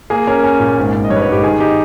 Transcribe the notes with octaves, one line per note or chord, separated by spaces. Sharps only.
A#3 G#4
C#4 A#4
C#4
A#2
G#1
G#1
D#5
G2 C#5
B4
C#5
G#1
G4
D#3 G#4
D#4 G4